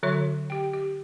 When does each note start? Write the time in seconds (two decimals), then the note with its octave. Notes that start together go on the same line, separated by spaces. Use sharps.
0.03 D3 F#3 F#4 C#5 E5
0.50 G4 G5
0.73 G4